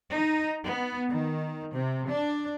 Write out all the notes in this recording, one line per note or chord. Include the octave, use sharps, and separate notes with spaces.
D#4
B3
D#3
C3
D4